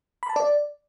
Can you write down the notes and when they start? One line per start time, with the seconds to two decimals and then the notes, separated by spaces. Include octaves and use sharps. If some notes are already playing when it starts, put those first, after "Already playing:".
0.23 B5
0.29 A5
0.36 D5